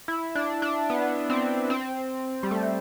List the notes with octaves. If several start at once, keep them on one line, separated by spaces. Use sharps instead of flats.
E4
D4
D4
B3
C4
C4
G3
A3